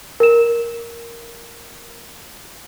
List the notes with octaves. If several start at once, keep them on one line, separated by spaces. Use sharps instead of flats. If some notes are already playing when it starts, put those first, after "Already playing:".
A#4 E7